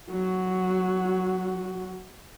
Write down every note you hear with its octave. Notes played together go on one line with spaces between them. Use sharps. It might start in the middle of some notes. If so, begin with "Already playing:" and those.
F#3 F#4